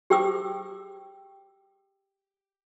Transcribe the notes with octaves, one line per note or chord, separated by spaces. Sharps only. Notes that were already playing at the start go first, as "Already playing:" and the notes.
G4 G#4 G5 D6 E6